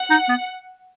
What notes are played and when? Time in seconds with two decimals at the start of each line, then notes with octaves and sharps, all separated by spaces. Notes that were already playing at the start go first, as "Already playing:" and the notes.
Already playing: F#5
0.10 D#4
0.29 B3